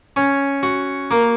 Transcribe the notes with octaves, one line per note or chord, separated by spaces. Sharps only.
C#4
F#4
A#3